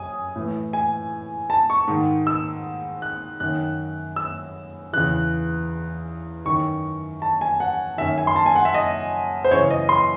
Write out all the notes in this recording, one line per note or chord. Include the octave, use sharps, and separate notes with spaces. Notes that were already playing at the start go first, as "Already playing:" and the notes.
Already playing: F#2 G#5 D#6
A2 E3
G#5
A5
C#6
G#2 D#3
E6
F#6
F#2 D#3 F#6
E6
E2 C#3 E3 F#6
F#2 D#3 C#6
A5
G#5
F#5
F#2 D#3 E5
G#5
C6
A5
G#5
F#5
E5
D#5
C5
F#2 C#3 E3 C#5
D#5
C6